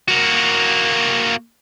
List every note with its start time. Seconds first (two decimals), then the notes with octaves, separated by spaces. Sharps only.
0.08 A#3 F#4